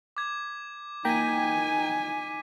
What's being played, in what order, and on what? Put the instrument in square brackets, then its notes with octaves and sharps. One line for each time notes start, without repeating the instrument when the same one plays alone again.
[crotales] D6 G#6
[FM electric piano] A#3 G5 A#5 [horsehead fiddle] D#4 G#5 [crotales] B6 D#7